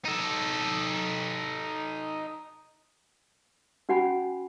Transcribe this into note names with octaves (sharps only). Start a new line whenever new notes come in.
D#4 A4
C#4 F#4 F#5 G#5 B5